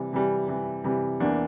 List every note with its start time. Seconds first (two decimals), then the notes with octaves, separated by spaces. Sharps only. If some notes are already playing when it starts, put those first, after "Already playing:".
Already playing: C3 E3 G3
0.13 C3 E3 G3
0.48 C3 E3 G3
0.84 C3 E3 G3
1.20 E2 E3 A#3 D4